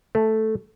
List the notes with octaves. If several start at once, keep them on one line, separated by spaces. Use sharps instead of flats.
A3